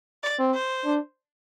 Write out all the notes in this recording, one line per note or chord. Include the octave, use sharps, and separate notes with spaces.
D5
C4
C5
D4